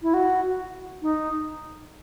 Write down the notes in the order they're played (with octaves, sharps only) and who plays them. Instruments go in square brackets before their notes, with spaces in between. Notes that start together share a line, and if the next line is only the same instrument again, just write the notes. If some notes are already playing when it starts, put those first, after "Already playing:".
[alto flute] E4
F#4
D#4